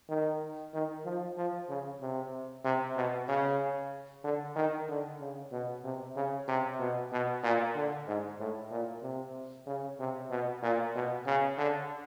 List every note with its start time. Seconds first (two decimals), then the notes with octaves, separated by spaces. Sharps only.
0.09 D#3
0.74 D#3
1.05 F3
1.37 F3
1.69 C#3
2.01 C3
2.64 C3
2.96 B2
3.28 C#3
4.24 D3
4.56 D#3
4.89 D3
5.20 C#3
5.52 B2
5.84 C3
6.16 C#3
6.48 C3
6.80 B2
7.12 B2
7.43 A#2
7.75 D3
8.07 G#2
8.39 A2
8.71 A#2
9.03 C3
9.67 C#3
9.99 C3
10.30 B2
10.62 A#2
10.95 B2
11.26 C#3
11.58 D3